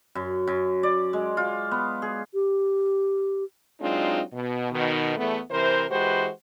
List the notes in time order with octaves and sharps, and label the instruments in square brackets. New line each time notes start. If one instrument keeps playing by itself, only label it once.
[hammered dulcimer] F#2
F#2
D5
G#3
F4
B3
G#4
[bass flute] G4
[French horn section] F#3 G#3 C4 D4 D#4 F4
B2
B2 D#3
E2 A3 B3
C3 E3 A#4 C5
E3 G#3 F#4 G4 B4 C5